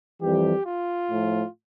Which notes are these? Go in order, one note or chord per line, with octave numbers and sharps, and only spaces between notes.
F2 E3 G3 G4
F4
A2 F3